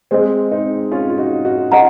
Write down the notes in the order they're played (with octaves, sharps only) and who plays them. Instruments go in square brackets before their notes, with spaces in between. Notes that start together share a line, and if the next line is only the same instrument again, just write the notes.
[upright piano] G#3 C4 [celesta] G#4 C5 D#5 G#5
[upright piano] C4 D#4
C#4 F4
F4
D#4 F#4
D#4 F#4
[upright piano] C#4 F4 [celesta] D#5 F#5 A#5